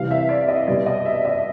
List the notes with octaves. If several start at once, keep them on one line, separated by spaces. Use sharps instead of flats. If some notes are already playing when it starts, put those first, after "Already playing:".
Already playing: C3 E3 G3 F5
E5
D5
D#5
B2 G3 D5
D#5
E5
D#5